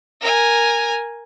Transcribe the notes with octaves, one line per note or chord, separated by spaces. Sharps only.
A#4 G#5